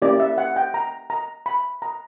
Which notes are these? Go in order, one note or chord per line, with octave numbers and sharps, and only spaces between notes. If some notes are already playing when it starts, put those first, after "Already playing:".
A#3 C#4 E4 G4 D5
E5
F#5
G5
A#5
A#5
B5
A#5